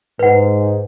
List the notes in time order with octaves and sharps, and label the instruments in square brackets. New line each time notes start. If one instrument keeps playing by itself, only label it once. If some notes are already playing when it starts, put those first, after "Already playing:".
[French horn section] G#2 [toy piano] B4 F#5